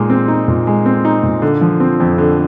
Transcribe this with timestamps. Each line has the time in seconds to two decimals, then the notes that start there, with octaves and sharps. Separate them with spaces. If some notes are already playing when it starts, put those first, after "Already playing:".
Already playing: A#2 G#3 D#4
0.10 C4
0.28 D#4
0.48 A#2
0.67 G#3
0.86 C4
1.05 D#4
1.23 A#2
1.42 D3
1.61 F3
1.80 C4
2.00 F2
2.18 D3